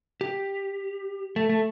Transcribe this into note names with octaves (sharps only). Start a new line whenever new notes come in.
G4
A3
A3